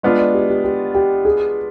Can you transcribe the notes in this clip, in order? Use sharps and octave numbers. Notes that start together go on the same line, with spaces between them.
G#3 B3 D4 F4 D#5
D5
G4
G4
G4
G4
G#4